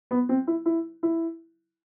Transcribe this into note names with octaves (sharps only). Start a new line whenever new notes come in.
B3
C4
E4
E4
E4